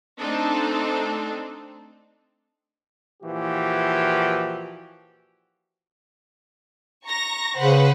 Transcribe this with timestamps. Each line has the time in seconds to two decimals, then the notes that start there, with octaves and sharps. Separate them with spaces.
0.19 A3 C4 D4 D#4 A4
3.23 A#2 E3 F3 F#4 G4
7.06 A#5 C#6 A#6
7.57 C#3 B4 C5 F#5